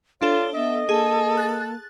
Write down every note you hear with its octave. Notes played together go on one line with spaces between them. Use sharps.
D4 F4 A4 C#5 G7
B3 D#5 E5
A#3 G#4 A4
F#6 A6